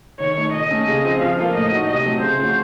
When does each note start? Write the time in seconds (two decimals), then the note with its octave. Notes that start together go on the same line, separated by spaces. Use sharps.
0.20 D#3 C#5
0.37 A3 D#4
0.54 A#2 D#5
0.71 A3 C#4 A4
0.88 C#3
1.04 F3 C4
1.21 F3 F5
1.38 A#3 F4 A4
1.55 A2 D#5
1.71 A3 D#4 F#4
1.89 C3 D#5
2.05 F#3 A3 C4
2.22 C#3 C5
2.39 F3 A3 C#4 F#4